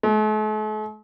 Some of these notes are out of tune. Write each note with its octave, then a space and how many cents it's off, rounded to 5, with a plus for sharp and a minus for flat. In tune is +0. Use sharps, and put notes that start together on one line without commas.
A3 -45